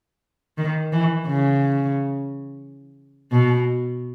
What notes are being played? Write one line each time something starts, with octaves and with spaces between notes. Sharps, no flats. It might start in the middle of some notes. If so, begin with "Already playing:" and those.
D#3
E3
C#3
B2